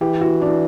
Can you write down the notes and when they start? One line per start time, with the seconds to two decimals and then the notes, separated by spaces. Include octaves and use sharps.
0.01 E3 G4
0.21 F#4
0.42 D4